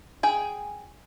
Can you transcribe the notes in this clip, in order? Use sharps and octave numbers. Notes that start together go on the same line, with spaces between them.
G#4 G5